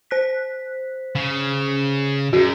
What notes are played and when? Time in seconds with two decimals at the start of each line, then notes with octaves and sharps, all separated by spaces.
0.11 C5 F#6 B6
1.16 C#3
2.33 F#2 F#4 G#4